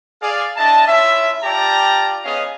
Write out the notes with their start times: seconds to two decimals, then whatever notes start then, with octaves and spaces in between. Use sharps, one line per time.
0.22 G#4 D5 F5
0.57 D4 E4 D#5 A5
0.88 C#4 E4 F4 E5
1.44 F4 G4 D5 G5 A5 A#5
2.24 B3 C#4 G#4 D#5 F5